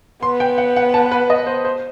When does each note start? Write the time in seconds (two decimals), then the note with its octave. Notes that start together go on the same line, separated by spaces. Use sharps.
0.23 B3 C6
0.40 G5
0.58 F#5
0.76 F#5
0.94 A5
1.11 B4
1.30 D#5
1.46 C5
1.65 C5